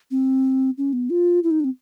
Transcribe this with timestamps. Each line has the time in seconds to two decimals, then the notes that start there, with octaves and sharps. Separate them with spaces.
0.11 C4
0.78 C#4
0.93 B3
1.10 F4
1.43 E4
1.51 D#4
1.60 D4
1.64 C4